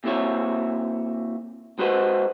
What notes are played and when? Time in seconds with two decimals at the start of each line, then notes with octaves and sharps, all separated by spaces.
0.04 A#2 C4 E4 F#4 C#5
1.79 G#3 F#4 B4 C5 D#5 F#5